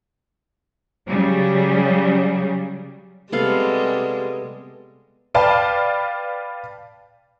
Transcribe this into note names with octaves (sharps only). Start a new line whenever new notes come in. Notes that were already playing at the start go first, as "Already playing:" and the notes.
C#3 F#3 G3
C3 G3 G#3 B3 A4 F5
B4 D5 F5 G5 A5